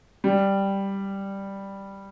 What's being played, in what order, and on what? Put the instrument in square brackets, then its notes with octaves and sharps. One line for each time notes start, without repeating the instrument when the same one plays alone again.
[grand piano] G3